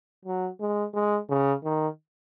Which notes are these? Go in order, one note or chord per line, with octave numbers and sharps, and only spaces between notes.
F#3
G#3
G#3
C#3
D#3